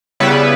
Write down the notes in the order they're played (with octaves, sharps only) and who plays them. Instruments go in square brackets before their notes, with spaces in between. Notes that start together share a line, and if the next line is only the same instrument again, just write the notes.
[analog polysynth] C#3 G3 B3 E4 B4